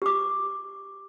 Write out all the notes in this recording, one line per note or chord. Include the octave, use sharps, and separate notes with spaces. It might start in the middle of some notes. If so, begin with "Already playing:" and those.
G4 D6